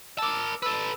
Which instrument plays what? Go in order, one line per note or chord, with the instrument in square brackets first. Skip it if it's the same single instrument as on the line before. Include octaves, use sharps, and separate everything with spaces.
[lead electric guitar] A#4 A5 [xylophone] D6 E6
[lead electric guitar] A4 B4 [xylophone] E6